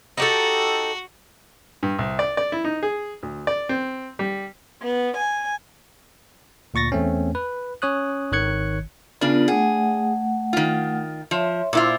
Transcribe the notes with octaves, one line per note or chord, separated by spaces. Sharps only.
D#4 F#4 G4 A4
G2
C2
D5
D5
E4
D#4
G#4
D2
D5
C4
G3
B3
G#5
D2 A#2 C#6 A6 A#6
E2 A3 C4 C#4
B4
C#4 C#5 D#6 F#6
G#1 D#3 C#5 F#6 G#6 C#7
C#3 B3 D4 F4 A#4
A3 G#4 F#5
D#3 F4
F3 C#5 E5 C6
A#2 E4 F4 C5 D6